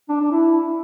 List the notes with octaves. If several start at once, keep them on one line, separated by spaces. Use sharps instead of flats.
D4
D4
E4